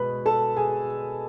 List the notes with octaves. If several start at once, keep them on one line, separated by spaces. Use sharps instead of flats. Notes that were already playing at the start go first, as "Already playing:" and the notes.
Already playing: B2 G#3 B3 B4 B5
A4 A5
G#4 G#5